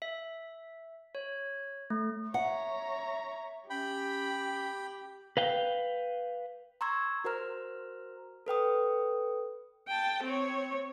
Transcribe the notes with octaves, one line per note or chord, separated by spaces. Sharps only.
E5
C#5
A3
C#5 E5 F#5 A#5
C#4 G4 G5 B5
B4 F5 G5
A#5 C6 C#6 E6 G#6
F#4 A#4 C5 A#5 F6
A4 B4 G5 D#6
G5 A5
C4 C#5